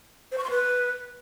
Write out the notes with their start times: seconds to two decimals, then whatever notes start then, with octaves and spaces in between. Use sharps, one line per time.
0.32 C5
0.38 C#6
0.44 C6
0.50 B4